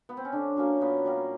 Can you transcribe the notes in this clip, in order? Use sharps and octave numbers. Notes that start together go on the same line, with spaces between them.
B3
C4
C#4
D3 D4
F#3 A#3 C#4
A#2 B3
G3 A#3